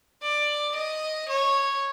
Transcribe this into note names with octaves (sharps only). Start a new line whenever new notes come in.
D5
D#5
C#5